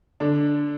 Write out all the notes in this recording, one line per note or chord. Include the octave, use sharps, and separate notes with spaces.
D3 D4